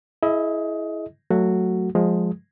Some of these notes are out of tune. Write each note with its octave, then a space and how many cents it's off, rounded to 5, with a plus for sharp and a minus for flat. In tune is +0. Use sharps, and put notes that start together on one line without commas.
E4 +0 G#4 +30 D#5 +20
F#3 +0 A3 +10 F#4 +0
F3 +25 G#3 +0